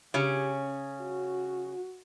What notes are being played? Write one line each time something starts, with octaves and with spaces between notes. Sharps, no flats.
C#3 C#4 G4
F#4